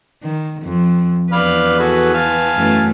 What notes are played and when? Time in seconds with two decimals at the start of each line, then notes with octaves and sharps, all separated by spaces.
0.23 D#3
0.63 F2
1.33 E2 B4 D5 F5 B5
1.79 F#4 G#4 A4
2.14 F5 G#5 A5
2.56 F#2 E3 A3